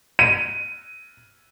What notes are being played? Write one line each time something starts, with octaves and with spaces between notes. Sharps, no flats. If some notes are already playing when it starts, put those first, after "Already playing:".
D#7